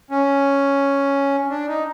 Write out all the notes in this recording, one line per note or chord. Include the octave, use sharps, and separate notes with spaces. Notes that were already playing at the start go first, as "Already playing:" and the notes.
C#4
D4
D#4